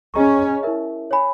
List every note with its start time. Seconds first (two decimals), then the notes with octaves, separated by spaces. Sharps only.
0.14 C#4 G#4 D#5 A#5 C#6
0.63 E4 A#4 E5
1.11 C#5 G#5 B5